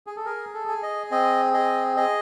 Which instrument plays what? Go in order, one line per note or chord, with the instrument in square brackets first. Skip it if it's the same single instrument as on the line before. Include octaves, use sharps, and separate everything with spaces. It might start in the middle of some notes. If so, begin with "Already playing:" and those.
[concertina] G#4
A4
G#4 A#4
A4
G#4
D#5
C4 D#5
G#4 D#5
G#4 D#5